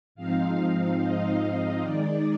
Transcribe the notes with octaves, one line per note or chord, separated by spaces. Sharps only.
G#2 F3 C4 D#4 F5
F5
D#5
D#3 G#3 D#4 D5